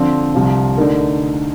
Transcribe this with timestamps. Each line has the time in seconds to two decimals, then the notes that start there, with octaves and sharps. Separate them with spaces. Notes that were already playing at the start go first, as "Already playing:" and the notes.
Already playing: D3 F3 C4
0.34 C2 C3 F3
0.78 D3 A3 D#4 A#4